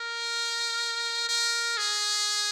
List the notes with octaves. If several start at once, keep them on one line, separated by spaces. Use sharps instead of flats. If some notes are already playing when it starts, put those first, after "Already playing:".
Already playing: A#4
A#4
G#4